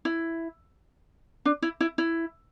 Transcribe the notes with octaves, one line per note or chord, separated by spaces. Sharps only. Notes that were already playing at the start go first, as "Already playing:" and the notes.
E4
D4
E4
E4
E4